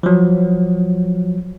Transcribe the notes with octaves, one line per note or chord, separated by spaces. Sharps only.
F3 F#3